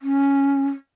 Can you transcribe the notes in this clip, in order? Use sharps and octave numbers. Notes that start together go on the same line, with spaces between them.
C#4